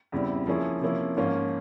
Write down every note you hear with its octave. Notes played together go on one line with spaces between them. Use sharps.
E2 C#3 G3 C4 E4
F3 A#3 C#4 E4 G#4
C3 F3 A#3 C#4 E4
G#2 F3 A#3 C#4 F4